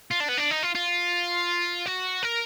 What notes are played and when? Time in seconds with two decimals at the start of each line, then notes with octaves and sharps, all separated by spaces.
0.11 F4
0.20 D4
0.29 B3
0.38 D4
0.51 D#4
0.63 F4
0.75 F4
1.86 F#4
2.23 A#4